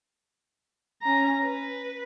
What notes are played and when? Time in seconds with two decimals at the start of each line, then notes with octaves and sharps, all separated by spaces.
1.02 C#4 A#5
1.43 B4